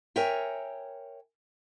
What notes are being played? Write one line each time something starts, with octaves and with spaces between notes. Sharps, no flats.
A#4 C#5 E5 G5 G#5